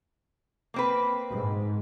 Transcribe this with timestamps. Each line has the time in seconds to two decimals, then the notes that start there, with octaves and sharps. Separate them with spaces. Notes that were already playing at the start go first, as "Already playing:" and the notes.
0.74 A#3 C4 B4
1.32 G#2